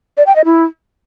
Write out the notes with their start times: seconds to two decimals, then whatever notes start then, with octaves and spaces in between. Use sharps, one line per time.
0.17 D5
0.26 G5
0.36 D#5
0.45 E4